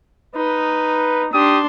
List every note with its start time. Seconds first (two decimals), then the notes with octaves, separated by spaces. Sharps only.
0.36 D#4 B4
1.33 D4 G4 C6 D#6